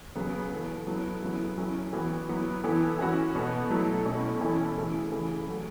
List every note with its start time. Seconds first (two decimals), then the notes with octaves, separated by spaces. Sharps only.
0.16 C#3 F#3 B3
0.51 E3 B3 A4
0.87 F#3 B3 E4 A4
1.22 C#3 F#3 B3 E4
1.57 F#3 C#4 E4 A4
1.93 E3 B3 F#4
2.29 F#3 B3 E4
2.64 E3 B3 E4 A4
2.99 E3 C#4 F#4
3.35 B2 B3 A4
3.70 F#3 A3 E4 A4
4.05 B2 A3 C#4 A4
4.41 E3 C#4 E4 A4
4.76 C#3 E3 A3
5.11 C#3 E3 A3
5.47 F#3 A3 F#4 A4